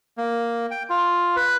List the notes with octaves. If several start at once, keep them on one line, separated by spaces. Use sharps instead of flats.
A#3
G5
F4
B4